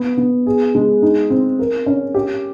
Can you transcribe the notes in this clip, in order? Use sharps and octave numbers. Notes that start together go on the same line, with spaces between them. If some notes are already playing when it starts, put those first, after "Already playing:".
Already playing: B3
B3
G#4
G#3
D#4
C4
A#4
C#4
G4